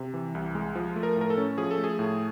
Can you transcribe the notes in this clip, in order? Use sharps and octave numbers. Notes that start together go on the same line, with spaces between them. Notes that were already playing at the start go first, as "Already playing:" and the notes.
Already playing: C3
E3
C2
G#3
F3
A3
A#4
A2
A#4
A4
C#4
F3 G#4
A4
A3
G#4
A2